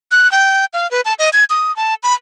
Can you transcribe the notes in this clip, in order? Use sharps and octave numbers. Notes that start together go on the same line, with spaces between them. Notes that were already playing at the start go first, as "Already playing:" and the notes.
F#6
G5
F5
B4
A5
D#5
G#6
D#6
A5
B5